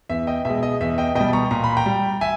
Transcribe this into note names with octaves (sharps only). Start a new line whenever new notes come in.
E2 E5
D#5 G5
B2 G#3 E5
D#5
E2 E5
D#5 G5
B2 G3 D#5 G5
A#5 C#6
A#2 A#5
B5
G5 A#5
G3
E5 G#5